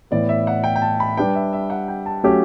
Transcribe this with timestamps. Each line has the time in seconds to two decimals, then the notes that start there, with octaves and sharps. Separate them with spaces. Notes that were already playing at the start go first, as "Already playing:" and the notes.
0.11 A2 E3 B3 D5
0.29 E5
0.47 F#5
0.64 G5
0.76 G5
0.82 A5
1.00 B5
1.17 G3 D4 G4 B4 G5
1.35 E5
1.53 E5
1.70 F#5
1.88 G5
2.06 A5
2.24 F#3 A3 C#4 G4